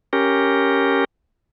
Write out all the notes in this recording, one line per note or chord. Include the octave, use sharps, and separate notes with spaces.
C#4 G4 A#4